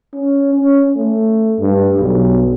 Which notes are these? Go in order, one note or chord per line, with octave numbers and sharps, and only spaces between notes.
C#4
C#4
A3
G2
B1